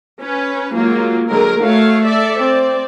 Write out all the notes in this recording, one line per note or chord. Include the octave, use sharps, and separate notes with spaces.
C#4 B4
F#3 G#3 A#3 F4
D3 F#3 G#3 A#4
A3 F#4 C#5 F5
A4 D5 E5
C4 D5